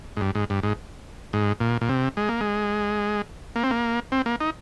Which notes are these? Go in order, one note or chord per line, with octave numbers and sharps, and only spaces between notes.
G#2
G2
G#2
G2
G#2
G#2
A#2
A#2
C3
G#3
A#3
G#3
A#3
C4
A#3
C4
A#3
D#4